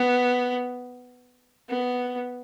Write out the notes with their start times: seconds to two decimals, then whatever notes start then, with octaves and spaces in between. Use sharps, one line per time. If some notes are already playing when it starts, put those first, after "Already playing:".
Already playing: B3
1.69 B3